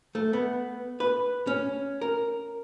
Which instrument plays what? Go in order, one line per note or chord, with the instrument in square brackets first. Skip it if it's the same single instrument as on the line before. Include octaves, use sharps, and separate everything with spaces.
[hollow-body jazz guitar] A3
B3
B4
C#4
A#4